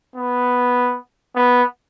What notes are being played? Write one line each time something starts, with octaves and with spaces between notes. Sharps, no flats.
B3
B3